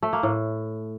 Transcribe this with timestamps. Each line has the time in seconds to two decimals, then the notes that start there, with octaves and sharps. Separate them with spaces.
0.03 A3
0.13 A#3
0.23 A2